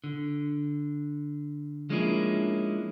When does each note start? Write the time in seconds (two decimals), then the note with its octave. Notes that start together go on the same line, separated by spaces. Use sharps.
0.04 D3
1.89 F3 G#3 A#3 C#4 D4 E4